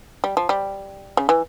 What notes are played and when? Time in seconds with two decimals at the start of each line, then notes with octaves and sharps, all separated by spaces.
0.24 G3
0.37 F3
0.49 G3
1.17 C#3
1.29 E3